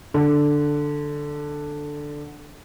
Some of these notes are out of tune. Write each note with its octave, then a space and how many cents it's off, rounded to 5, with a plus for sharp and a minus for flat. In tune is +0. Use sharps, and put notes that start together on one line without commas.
D3 +5